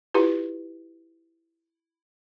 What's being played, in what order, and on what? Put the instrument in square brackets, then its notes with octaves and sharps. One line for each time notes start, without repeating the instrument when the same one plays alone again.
[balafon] E4 F4 G4 B4